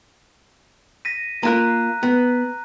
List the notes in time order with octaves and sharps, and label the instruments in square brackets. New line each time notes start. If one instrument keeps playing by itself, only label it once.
[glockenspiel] A#6 B6 D#7
[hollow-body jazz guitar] A#3 F4 A#4 [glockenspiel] A#5 F#6
[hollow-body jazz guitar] B3